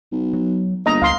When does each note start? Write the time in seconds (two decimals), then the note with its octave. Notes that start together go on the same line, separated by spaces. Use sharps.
0.12 B1
0.33 F#3
0.86 G1 A#3 D#5 A#5
1.02 D2 F5 C6